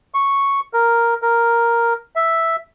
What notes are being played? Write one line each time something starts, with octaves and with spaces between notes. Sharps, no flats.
C#6
A#4
A#4
E5